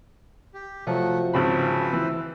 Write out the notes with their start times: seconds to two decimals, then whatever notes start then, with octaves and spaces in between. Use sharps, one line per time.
0.54 G4
0.87 C3 F3 F#3 A3 F#5
1.34 G#1 C#3 B4 C5 B5
1.93 E3